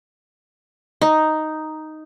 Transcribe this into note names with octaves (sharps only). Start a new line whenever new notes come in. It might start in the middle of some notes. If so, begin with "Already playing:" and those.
D#4